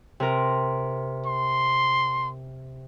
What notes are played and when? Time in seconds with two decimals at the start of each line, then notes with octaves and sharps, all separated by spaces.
0.20 C3 A#4
1.26 C6